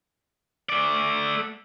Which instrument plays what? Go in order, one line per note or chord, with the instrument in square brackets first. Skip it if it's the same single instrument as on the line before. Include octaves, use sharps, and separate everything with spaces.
[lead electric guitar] A3 D5